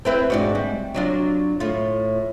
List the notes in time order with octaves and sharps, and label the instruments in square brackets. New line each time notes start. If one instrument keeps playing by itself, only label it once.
[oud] C4 E4 B4
G#2 D4 F#4
G3
F#3 D4 F4
A2 F4